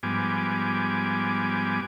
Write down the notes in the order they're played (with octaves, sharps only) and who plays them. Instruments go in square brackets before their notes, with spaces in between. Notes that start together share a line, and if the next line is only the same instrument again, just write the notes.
[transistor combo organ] G#2 F3 G3 B3 G#5 D6